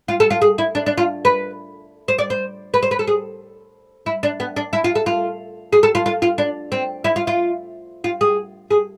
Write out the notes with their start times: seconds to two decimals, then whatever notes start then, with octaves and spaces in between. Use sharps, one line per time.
0.08 F4
0.20 A4
0.30 F4
0.42 G#4
0.58 E4
0.75 D4
0.86 D4
0.98 F4
1.25 B4
2.08 C5
2.18 D5
2.30 C5
2.74 B4
2.83 C5
2.91 B4
2.99 A4
3.07 G#4
4.06 E4
4.23 D4
4.40 B3
4.56 D4
4.73 E4
4.84 F4
4.95 A4
5.06 F4
5.73 G#4
5.83 A4
5.95 F4
6.06 F4
6.22 F4
6.38 D4
6.72 C4
7.04 E4
7.16 F4
7.27 F4
8.04 F4
8.21 G#4
8.71 G#4